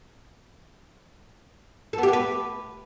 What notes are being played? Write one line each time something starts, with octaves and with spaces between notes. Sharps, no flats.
A4
B3
G4
B3
B4